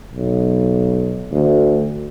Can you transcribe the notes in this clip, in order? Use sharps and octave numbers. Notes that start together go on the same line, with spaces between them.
B1
D2